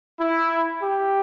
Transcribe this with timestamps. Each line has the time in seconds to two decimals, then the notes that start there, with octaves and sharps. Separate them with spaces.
0.20 E4
0.83 G4